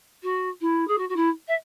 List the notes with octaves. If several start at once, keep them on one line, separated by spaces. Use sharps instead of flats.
F#4
E4
G#4
F#4
F#4
E4
E5